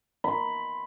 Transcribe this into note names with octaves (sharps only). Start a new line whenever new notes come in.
B5 C6